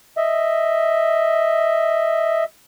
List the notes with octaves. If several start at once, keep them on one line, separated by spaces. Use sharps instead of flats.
D#5 E5